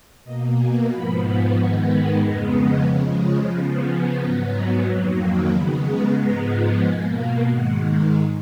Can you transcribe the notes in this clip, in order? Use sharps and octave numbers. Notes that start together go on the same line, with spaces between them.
B2 A#3 D#5
G#5
G#2 F3 B3 B5
G#2 D#3 G#3 B3 C#6
B5
F2 C#3 G#3 B3 A#5
D#5
C#3 F3 G#3 C#5
C#5
C#3 F3 B3 F5
G#5
G#2 F#3 B3 A#5
A#5
F2 D#3 F#3 A#3
C#3 G#3 B3 B5
A#5
G#2 F3 G#3 B3 A#5
B2 A#3 G#5
F5
G#2 D#3 G#3 F#5